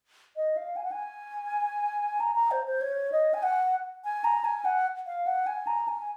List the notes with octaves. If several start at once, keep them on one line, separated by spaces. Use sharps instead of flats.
D#5
F5
G#5
F#5
G#5
A#5
A#5
C5
C5
C#5
D#5
G#5
F#5
G#5
A#5
G#5
F#5
F5
F#5
G#5
A#5
G#5